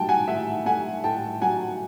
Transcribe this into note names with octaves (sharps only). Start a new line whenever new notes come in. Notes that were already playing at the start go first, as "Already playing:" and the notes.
Already playing: A2 F#3 G5 A5
F#5 G#5
A2 E5 F#5
A3 F#5 G#5
A2 G5 A5
F#3 F#5 G#5